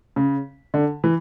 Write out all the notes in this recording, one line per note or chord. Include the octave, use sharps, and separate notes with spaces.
C#3
D3
E3